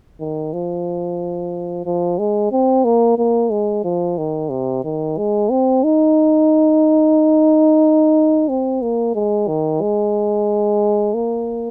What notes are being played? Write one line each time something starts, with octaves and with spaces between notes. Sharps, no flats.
D#3
F3
F3
G#3
C4
A#3
A#3
G#3
F3
D#3
C3
D#3
G#3
C4
D#4
C4
A#3
G#3
D#3
G#3
A#3